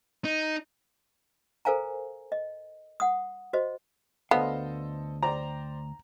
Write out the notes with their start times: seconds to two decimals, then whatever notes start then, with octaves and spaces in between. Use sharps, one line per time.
0.25 D#4
1.65 A4 A#4 C5 F5 G#5 A#5
2.32 D#5
3.00 F#5 D#6
3.53 F#4 C5 D#5
4.31 D2 B3 A4 C5 D#5 F5
5.23 C5 D5 G5 A#5